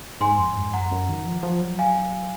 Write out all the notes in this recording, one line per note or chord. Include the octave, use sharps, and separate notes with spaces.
G#2 G#5 C6
F2
G#2
F#2 F#5 A#5
F#2
D#3
F3
F3
F#3
F5 G#5